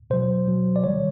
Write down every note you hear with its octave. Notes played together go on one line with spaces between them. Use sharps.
B2 F#3 C5
B2 F#3
D5
C3 D#3 G3 C#5